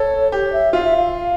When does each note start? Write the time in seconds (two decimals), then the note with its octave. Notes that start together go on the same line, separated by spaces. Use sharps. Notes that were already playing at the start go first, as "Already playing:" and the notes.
Already playing: A4 C#5
0.32 G4 C#5
0.53 E5
0.73 F4 F5
0.85 E5
0.97 F5